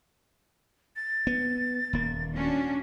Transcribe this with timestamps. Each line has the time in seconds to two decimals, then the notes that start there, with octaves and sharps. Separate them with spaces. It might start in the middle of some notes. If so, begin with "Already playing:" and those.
0.96 A6
1.27 B3
1.93 D#1 A#3
2.34 C#4 D4 F#4